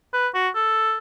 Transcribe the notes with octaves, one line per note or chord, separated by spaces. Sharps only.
B4
F#4
A4